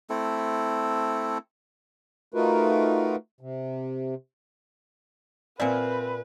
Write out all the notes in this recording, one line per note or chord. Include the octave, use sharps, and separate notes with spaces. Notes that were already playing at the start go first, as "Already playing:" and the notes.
A3 C4 E4 A4
A3 D#4 F4 F#4 A#4 B4
C3
A#2 C4 B4 D5 E5 G#5